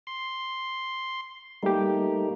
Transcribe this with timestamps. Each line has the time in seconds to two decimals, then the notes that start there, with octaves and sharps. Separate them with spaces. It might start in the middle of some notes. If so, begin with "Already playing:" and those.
0.07 C6
1.63 G3 A3 A#3 D#4 G4